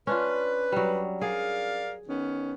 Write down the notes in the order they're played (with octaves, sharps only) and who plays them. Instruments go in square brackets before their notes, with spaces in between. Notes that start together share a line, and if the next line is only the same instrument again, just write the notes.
[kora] C#4 D4 F4 [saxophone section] B4
[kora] F#3 G3
[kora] G#4 [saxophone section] A#4 D5 F5
[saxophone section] D#3 B3 C#4